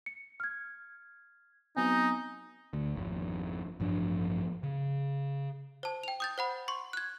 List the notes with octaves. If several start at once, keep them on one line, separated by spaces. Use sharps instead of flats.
C#7
F6 G#6
F#3 B3 C4 D#4 G#5
D2
G#1 F2
A1 G2 F3 D4
C#3
C5 A5
G5 F7
D#6 G6 A6
C5 F#5 B5
C6 C#6
F#6 G#6